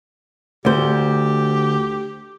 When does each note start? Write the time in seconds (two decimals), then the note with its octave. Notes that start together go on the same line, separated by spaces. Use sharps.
0.65 D2 G4 C5